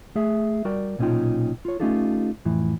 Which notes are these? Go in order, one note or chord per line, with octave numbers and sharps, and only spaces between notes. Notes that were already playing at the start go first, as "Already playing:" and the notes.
A3 G#4 E5
G3 F#4 A#4 D5 G5
B1 A#2 C#4 D#4 F4 G5
F4 C#5
A3 C#4 D#4 F4 G4 A4
F2 A2 E3